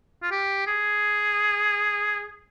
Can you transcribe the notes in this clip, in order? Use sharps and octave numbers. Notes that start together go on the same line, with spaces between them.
F4
G4
G#4